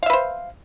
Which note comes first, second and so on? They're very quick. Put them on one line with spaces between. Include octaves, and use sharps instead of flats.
F5 E5 B4 C5